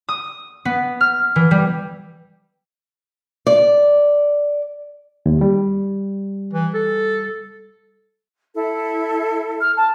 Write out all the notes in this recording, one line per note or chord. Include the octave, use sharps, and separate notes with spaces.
D#6
B3
F6
E3
G3
D5
D#2
G3
E3
A4
E4 A4
F6
A5